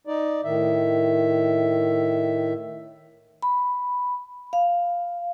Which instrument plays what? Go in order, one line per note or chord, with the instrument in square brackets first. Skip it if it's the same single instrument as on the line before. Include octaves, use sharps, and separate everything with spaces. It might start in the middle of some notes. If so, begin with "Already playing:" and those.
[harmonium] D#4 D5
A2 D#3 E5
[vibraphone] B5
F5